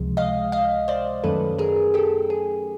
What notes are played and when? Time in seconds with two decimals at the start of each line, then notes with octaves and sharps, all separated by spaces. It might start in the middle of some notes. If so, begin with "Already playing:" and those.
Already playing: C#2 C3 F3 G#3
0.17 D#5 F5
0.52 D#5 F5
0.88 C5 D5
1.24 F#2 D#3 F#3 A3 C#4 A4 B4
1.58 G#4 A#4
1.94 G4 A4
2.30 G#4